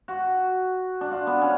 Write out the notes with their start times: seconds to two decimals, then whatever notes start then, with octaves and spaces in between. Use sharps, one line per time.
0.08 F#4
1.01 D4
1.11 F4
1.27 B3
1.42 C#4